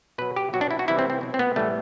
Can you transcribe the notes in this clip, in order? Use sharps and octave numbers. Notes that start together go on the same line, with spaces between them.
B2 F#3 B4
G4
B2 F#3 F#4
D4
E4
F#4
C3 E3 G3 E4
C4
C4
B2 F#3
C4
B3
A2 E3 G3 A3